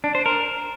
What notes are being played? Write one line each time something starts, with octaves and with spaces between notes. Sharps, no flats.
D4
C5
A#4